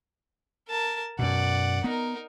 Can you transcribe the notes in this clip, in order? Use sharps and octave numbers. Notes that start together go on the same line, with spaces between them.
A#4 A5
F#2 B2 D5 F#5
B3 D#4 A#4